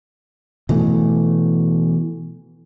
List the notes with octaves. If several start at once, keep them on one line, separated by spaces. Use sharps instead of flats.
B2 E3 A3